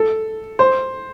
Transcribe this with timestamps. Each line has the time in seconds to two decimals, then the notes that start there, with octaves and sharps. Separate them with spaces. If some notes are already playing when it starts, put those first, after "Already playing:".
Already playing: A4
0.59 C5